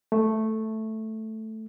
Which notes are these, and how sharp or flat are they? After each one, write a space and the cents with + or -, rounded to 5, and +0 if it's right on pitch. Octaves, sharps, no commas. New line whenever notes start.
A3 +0